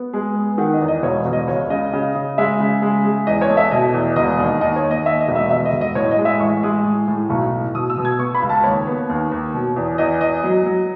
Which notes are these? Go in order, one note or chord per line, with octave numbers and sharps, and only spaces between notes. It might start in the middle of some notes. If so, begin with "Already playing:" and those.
Already playing: B3
G#3
B3
D#3 F#5
D#5
E2
D#5
E1 C#5
E1
D#5
C#2 C#5
C#3 D#5
C#3
C#3
G#3 E5
C#3
G#3
G#3
E2 D#5
C#5
A3
E5
B2 D#5
E2
E1 D#5
D#2
D#2 D#5
C#5
D#2
D#5
D#2 E5
D#5
E1
E5
E1 E5
D#5
E1
D#5
A2 C#5
D#5
G#3
E5
A1 C#6
G#3 D#6
A2
A2
B1 C#6
A2
B2 D#6
E6
B2
G#6
B3 C#6
B5
C#2
A5
D#2 C#5
B3
D#2
D#2
B2
E2
E2 D#5
E2 D#5
F#3
F#3